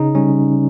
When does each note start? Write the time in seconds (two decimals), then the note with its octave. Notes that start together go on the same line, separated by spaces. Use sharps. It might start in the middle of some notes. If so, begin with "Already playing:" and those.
Already playing: C#3 D#4
0.15 G3 C#4